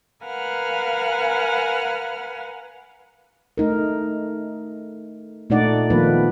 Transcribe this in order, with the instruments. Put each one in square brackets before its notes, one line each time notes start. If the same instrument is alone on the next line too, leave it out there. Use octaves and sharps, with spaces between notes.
[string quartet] A#4 B4 F5 F#5 G#5 F6
[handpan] A3 D#4 A#4
A#2 A3 D4 D#4 D5 F#5
D#3 F3 A#3 B3 B4